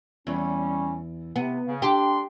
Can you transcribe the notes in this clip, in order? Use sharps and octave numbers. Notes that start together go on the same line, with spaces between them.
E2 G3 C#4
C3 B3
C#3
D4 G4 C6